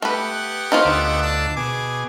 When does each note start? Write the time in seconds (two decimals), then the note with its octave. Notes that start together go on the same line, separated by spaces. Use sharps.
0.02 A3 B3 G4 B4 F#5
0.72 A#3 C#4 D#4 F4 C5
0.85 D2 D6 E6
1.22 D4 A5
1.57 B2 G#4 G#5 D6